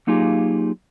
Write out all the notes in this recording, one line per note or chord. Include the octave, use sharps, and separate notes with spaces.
F#3 A#3 D#4 F4 G4 G#4